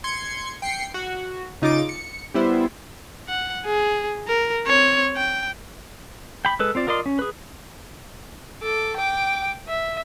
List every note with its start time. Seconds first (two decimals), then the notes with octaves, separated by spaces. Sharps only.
0.04 C6 G#6 C#7
0.62 G5 C7 C#7
0.94 F#4
1.62 C#3 D#4 F4 D6 A6 D7
1.89 C#7
2.34 G3 B3 E4 C5
3.29 F#5
3.66 G#4
4.28 A#4
4.67 C4 C#5
5.17 G5
6.45 G5 B5
6.59 G#3 A4 B4
6.75 C4 F4 D5
6.87 F4 A#4 D5 D#5 C6
7.06 C#4
7.19 G#4 B4
8.63 A4 D6
8.97 G5 D6
9.68 E5